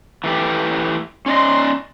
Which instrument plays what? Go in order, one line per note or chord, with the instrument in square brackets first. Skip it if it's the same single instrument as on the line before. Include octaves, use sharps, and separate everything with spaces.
[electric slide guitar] E3 A3 G4
[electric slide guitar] C#4 D5 D#5 [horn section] C6